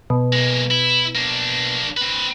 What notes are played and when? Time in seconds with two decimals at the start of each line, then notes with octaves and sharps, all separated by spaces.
0.10 B2
0.33 G#3 A#3
0.71 E4
1.15 A#3 D4
1.97 C4 B4